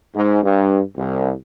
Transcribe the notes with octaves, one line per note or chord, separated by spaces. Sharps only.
G#2
G2
C2